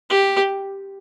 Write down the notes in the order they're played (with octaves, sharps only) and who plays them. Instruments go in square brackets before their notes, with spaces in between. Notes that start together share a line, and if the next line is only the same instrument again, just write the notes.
[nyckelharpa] G4